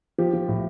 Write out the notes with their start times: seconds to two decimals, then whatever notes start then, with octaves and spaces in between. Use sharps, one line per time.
0.18 F3 G4
0.33 F3
0.48 A2